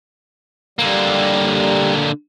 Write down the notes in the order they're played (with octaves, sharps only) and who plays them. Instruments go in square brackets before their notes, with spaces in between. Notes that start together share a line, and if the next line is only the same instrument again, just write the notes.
[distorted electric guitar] D3 A#3 [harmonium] G3